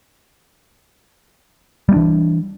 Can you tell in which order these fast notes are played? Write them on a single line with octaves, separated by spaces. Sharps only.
G3 A#3 D4 E3